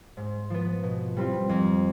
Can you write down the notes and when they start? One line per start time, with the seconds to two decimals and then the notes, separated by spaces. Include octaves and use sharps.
0.17 G#2
0.50 F3 B3
0.83 B2
1.17 G3 C4 F4
1.49 F2